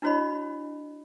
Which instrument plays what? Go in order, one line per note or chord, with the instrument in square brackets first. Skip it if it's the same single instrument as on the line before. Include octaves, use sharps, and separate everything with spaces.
[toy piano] D4 E4 F#4 C#5 D#5 B5